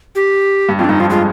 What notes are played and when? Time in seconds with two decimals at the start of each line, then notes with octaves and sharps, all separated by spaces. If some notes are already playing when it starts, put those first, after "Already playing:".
0.15 G4
0.69 G2
0.79 F2 F4
0.84 D4
0.89 G2 D#4
1.00 F3 F4
1.10 G#3 F4